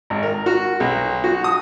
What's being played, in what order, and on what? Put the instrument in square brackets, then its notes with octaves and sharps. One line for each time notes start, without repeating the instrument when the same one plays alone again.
[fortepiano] G#1
A#4
F#4
B1
F#4
D#6